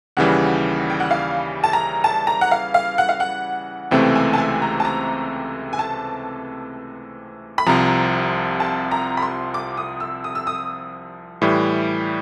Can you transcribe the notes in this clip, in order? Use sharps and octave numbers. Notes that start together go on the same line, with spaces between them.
D#2 C#3 E3 G3 F#5
G5
F#5
F5
A5
A#5
A5
A#5
F#5
F5
F5
F#5
F5
F#5
C#2 C3 E3 A3 C4 G5
G#5
A5
G#5
A#5
A5
A#5
G#5
A5
B5
C2 C3 F3 A#5
A5
A#5
B5
C6
D6
D#6
E6
D#6
E6
D#6
A2 E3 G3